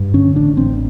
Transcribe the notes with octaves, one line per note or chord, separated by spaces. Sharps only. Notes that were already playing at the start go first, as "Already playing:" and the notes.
Already playing: G2
D3 C#4
A1 D4
A1 C4